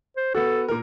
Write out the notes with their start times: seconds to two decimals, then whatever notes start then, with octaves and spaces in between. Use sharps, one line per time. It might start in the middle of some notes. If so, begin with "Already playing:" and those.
0.17 C5
0.35 B3 F#4 A4
0.68 A#2 A#4